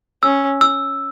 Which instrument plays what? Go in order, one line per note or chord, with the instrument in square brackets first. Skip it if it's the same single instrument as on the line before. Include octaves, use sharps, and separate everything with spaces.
[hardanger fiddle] C#4 [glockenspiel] E6
[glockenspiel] E6